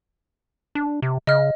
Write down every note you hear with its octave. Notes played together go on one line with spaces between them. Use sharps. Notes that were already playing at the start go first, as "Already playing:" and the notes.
D4
C3
C#3 D#5 F6